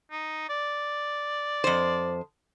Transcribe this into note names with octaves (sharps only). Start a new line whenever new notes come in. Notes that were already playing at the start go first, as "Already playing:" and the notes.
D#4
D5
F2 C5